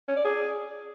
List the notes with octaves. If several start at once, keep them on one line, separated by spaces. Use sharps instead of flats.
C#4
D5
G#4